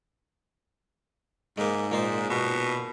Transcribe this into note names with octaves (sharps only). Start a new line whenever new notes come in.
G#2 G#3 A#3
A#2 D#4 C5
B2